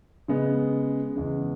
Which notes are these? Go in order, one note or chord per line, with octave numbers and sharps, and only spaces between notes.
C#3 G#3 B3
E2 C#3 G#3